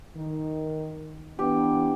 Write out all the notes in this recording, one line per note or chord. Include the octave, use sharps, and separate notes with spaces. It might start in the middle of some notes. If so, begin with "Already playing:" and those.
D#3
E3 B3 D4 G4